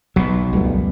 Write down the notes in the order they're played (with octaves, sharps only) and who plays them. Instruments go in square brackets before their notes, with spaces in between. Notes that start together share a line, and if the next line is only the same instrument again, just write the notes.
[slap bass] B1 [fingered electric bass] F#3 B3
[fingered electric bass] C#2 F#2 [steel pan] G3 A3 B3